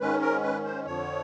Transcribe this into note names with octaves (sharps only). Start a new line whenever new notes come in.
G#2 D#3 G#3 C#4 B4
A#4
B4
C5
F2 D3 F3 C#5